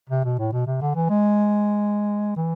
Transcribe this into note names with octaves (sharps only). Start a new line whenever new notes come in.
C3
B2
A2
B2
C3
D3
E3
G#3
E3